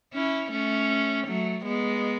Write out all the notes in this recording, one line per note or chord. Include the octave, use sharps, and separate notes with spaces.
C#4 E4
A3 C#4
F#3 A3
G#3 B3